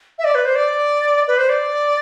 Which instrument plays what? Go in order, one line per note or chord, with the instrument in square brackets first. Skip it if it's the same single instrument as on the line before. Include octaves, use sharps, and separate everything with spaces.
[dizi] E5
D5
B4
C5
D5
B4
C5
D5